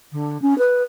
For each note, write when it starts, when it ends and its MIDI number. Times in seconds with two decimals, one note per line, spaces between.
0.13 0.40 50
0.42 0.57 61
0.58 0.83 71